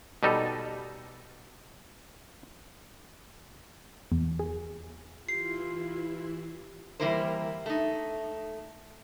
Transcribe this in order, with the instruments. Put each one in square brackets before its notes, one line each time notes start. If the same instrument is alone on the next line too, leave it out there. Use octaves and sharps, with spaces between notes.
[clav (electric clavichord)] B2 G3 D#4 A4
[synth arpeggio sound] E2
G#4
[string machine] E3 E4 [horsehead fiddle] F4 [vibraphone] G4 [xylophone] C7
[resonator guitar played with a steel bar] E3 G3 A#3 E4 A#4 C5
A3 D#4